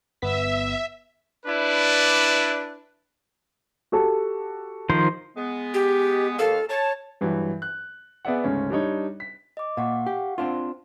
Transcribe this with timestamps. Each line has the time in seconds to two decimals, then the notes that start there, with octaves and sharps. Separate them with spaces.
0.22 G1 B3 E5 B6
1.46 D4 E4 B4 D5
3.92 F#4 G4 A4
4.90 D#3 F3 C5
5.37 G#3 B3
5.74 G4
6.39 D#2 A4 F5
6.69 C#5 A5
7.21 G2 E3 F#3
7.62 F#6
8.25 B3 G#4 D5 E5 F#5
8.44 D2 G#2 C#3 C#4
8.70 G3 D4 D#4 C#5
9.20 B6
9.57 D#5 D6
9.77 A#2 F5 F#5 C#6
10.06 G4
10.38 C4 D4 F4